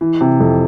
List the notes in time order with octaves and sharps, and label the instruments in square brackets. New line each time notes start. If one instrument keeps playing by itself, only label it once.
[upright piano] E3
C3
F2